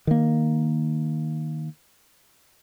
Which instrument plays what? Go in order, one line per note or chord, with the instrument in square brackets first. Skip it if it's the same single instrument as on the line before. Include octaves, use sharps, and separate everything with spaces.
[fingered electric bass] D#3 A#3